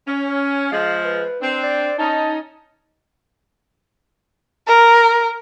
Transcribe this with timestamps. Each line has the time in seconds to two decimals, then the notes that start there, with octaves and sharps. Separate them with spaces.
0.06 C#4
0.72 F3 G#3 F5
1.05 B4
1.41 C4 D4
1.63 D5
1.99 C#4 D#4 A5
4.67 A#4